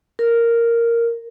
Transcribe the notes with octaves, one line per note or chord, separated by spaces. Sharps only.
A#4